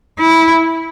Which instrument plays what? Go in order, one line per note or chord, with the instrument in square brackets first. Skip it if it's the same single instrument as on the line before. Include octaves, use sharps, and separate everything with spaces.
[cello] E4